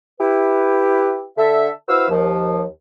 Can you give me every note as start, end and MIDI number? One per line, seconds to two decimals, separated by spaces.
0.19 1.24 64
0.19 1.24 67
0.19 1.24 71
1.37 1.68 50
1.37 1.68 69
1.37 1.68 76
1.87 2.07 64
1.87 2.07 66
1.87 2.07 71
1.87 2.07 72
1.87 2.07 77
1.87 2.07 88
2.09 2.63 39
2.09 2.63 53